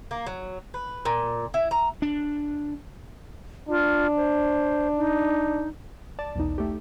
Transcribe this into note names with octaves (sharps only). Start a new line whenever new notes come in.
A#3
F#3
B4
A#2
E4
A#5
D4
D4 F4
C5
D#4
D5 A5
B1 E2 D#4
A3 G4